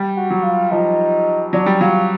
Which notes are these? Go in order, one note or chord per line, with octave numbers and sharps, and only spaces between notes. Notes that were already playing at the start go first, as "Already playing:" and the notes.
Already playing: G3
F#4
F#3
F4
F3 D#4
F#3 D4
G3
F#3 F4